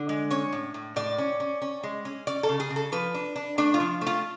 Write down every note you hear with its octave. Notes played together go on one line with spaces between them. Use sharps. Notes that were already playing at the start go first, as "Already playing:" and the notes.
Already playing: D3
G#3
C#4 C#5
A2
A2
A2 D5
C#4
C#4
C#4
G#3
C#4
C#4 D5
A4
C#3
G#4
C#3
A4
F3 B4
D4
D4
A3 D4
F4
F3
A3
F4